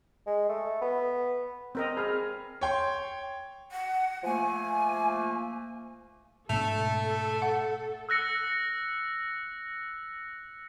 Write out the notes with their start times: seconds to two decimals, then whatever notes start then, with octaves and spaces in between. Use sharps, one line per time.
0.26 G#3
0.49 A3
0.81 B3
1.75 C4 A#4 D#5
1.97 G#4 B5 F6
2.61 C#5 G5 C6
3.72 F#5
4.24 F3 A3 A#3 G#5
6.49 G#2 B2 A3 D4 A4 F7
7.42 F#5
8.09 E6 F#6 A#6 C#7